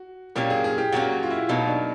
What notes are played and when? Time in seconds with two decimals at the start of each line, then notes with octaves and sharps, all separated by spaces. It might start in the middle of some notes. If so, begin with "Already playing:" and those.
Already playing: F#4
0.36 A#2 F#3 A#3 C#4 G4
0.50 G#4
0.64 G#4
0.78 G4
0.92 A#2 F#3 A#3 C#4 F#4
1.23 F4
1.30 E4
1.49 B2 F#3 A#3 D#4
1.68 D4